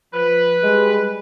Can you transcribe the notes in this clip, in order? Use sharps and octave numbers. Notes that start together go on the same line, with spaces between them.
F3 B4
G3 G#3